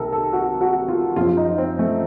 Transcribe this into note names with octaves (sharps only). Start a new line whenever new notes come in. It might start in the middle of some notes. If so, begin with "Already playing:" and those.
Already playing: C2 C3 D#3 A4 A#4
A4
F#4
F#4
F4
F#2 F3 F4
F4
D#4
C4
A3